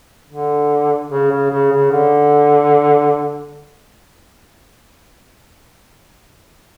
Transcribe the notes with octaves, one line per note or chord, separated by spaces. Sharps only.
D3
C#3
C#3
C#3
C#3
D3